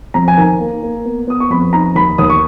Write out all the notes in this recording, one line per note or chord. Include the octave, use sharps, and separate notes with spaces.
F2 A#5
G#5
D#3 A#5
A#3
A#3
B3
B3 D#6
C#6
F2 B5
D#4 A#5
D#2 B5
D#2 D#6
C#6